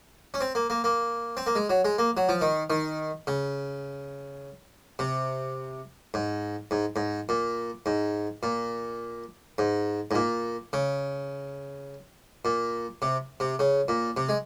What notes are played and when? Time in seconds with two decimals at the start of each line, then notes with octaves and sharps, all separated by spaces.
0.34 C#4
0.41 C4
0.55 A#3
0.70 A#3
0.84 A#3
1.37 C4
1.47 A#3
1.56 G#3
1.69 F#3
1.85 G#3
1.98 A#3
2.17 F#3
2.29 F3
2.41 D#3
2.70 D#3
3.27 C#3
4.99 C3
6.14 G#2
6.71 G#2
6.96 G#2
7.29 A#2
7.86 G#2
8.43 A#2
9.58 G#2
10.11 G#2
10.15 A#2
10.73 C#3
12.45 A#2
13.02 C3
13.40 C3
13.59 C#3
13.88 A#2
14.17 C3
14.29 G#3